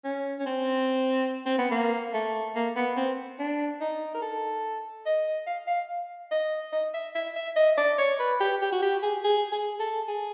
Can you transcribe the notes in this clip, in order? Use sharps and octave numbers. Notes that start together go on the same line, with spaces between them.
C#4
C#4
C4
C4
B3
A#3
A3
A#3
B3
C4
D4
D#4
A#4
A4
D#5
F5
F5
D#5
D#5
E5
E5
E5
D#5
D5
C#5
B4
G4
G4
F#4
G4
G#4
G#4
G#4
A4
G#4